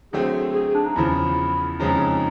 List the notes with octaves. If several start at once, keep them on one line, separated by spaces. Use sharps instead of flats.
D3 F#3 A3 C4 G#4
G#4
D4
D#4
E2 C#3 F3 E4
F2 C#3 F3 G#3 C#4 D#4